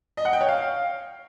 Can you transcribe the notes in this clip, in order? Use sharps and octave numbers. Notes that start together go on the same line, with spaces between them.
D#5
F#5
G5
C#5
F5